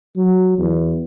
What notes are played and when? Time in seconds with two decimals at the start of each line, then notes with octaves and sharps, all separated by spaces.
0.17 F#3
0.58 E2